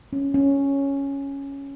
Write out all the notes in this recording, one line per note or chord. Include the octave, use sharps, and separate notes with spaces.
C#4
C#4